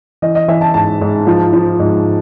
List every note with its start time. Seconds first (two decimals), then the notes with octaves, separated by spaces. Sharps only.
0.22 E3 D#5
0.35 D#5
0.48 E3 E5
0.61 A5
0.74 G#2 A5
1.01 G#2
1.27 F3
1.53 F3
1.79 G#2